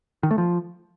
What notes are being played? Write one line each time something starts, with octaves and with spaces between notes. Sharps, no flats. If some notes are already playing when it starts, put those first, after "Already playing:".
D#3
A3
F3